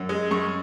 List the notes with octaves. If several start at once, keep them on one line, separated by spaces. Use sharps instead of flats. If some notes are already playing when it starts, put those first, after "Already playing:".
Already playing: F#2
G#3
F#2 C#6